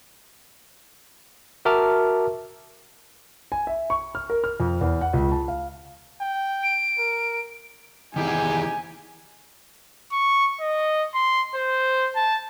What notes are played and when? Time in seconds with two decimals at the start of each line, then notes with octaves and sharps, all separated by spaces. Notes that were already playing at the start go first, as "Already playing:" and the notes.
1.65 F#4 A#4 E5 A5 D6 F6
3.52 G#5
3.67 E5
3.90 C#6
4.15 F6
4.30 A#4
4.44 F6
4.60 F2
4.81 E2
5.01 F#5
5.13 C#2
5.32 A5
5.48 F5
6.21 G5
6.63 D7
6.98 A#4
8.16 C3 D#3 E3 D#4 G4 G#4 G#5
10.12 C#6
10.61 D#5
11.15 C6
11.55 C5
12.16 A5